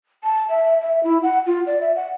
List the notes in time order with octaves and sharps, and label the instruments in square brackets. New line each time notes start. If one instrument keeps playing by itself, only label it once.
[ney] A5
E5
E5
E4
F#5
F4
D5
E5
F#5